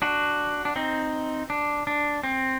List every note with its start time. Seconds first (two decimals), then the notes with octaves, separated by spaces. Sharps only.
0.02 D4 F#4
0.65 D4
0.76 C4 D#4
1.50 D4
1.87 D4
2.24 C4